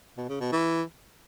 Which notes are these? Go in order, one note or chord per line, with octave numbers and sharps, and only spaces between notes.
B2
C#3
B2
E3